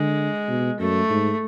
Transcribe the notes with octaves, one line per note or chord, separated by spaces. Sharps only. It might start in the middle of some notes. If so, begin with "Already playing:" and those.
Already playing: D3 G#3
B2
F#2 A3
G#2